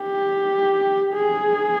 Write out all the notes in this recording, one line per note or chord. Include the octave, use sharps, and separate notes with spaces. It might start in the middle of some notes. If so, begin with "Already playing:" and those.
Already playing: G4
G#4